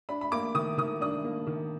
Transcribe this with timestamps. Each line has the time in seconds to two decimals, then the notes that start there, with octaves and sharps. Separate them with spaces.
0.09 D4 B5
0.21 B5
0.32 A#3 D6
0.55 D#3 D#6
0.78 D#3 D#6
1.01 D4 D#6
1.24 A#3
1.47 D#3